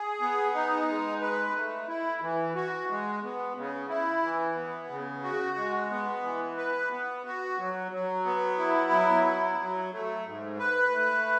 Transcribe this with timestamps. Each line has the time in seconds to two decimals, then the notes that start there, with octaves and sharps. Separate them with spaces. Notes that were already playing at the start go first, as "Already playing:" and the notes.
Already playing: G#4
0.21 B3
0.54 D#4
0.88 G#3
1.21 B4
1.56 A3
1.88 E4
2.21 E3
2.55 F#4
2.89 G#3
3.23 B3
3.56 C#3
3.89 E4
4.23 E3
4.56 B3
4.90 C#3
5.23 F#4
5.57 G#3
5.91 B3
6.23 E3
6.57 B4
6.91 B3
7.25 F#4
7.58 F#3
7.92 F#3
8.25 B3
8.58 E4
8.91 F#3
9.25 E4
9.58 F#3
9.92 A3
10.26 G#2
10.59 B4
10.92 A3